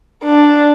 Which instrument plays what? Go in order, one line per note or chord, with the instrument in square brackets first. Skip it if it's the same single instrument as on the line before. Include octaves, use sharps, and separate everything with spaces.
[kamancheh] D4